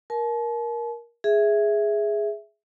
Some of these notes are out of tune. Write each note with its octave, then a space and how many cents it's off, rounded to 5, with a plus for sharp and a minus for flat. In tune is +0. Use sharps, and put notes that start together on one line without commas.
A#4 +15 A5 -40
G#4 +0 E5 +0